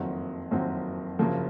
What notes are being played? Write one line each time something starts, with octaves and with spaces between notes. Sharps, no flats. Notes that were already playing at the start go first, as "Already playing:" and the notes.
Already playing: F#1 F2 D#3 F#3 C4
F#1 F2 D#3 F#3 C4
F#1 F#2 C#3 F3 A#3